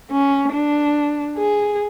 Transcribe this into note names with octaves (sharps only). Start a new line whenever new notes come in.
C#4
D4
G#4